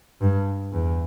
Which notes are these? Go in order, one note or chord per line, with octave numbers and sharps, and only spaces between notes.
G2
E2